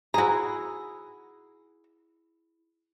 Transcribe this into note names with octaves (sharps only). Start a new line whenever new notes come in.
E4 F#4 G#4 A#5